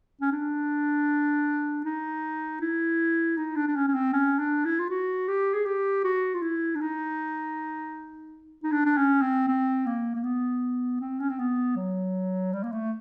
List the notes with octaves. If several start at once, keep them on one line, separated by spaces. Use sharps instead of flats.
C#4
D4
D#4
E4
D#4
D4
D4
C#4
C#4
C4
C#4
D4
E4
F4
F#4
G4
G#4
G4
F#4
F4
E4
D4
D#4
D#4
D4
D4
C#4
C4
C4
A#3
A#3
B3
C4
C#4
C4
B3
F#3
G3
A#3
A3